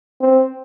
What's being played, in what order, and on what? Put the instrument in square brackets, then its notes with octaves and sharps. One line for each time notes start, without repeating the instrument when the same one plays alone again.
[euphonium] C4